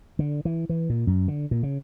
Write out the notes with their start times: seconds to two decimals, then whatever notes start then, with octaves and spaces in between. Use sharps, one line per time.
0.19 D3
0.45 E3
0.69 E3
0.90 A#2
1.07 F#2
1.28 D3
1.51 A#2
1.63 C#3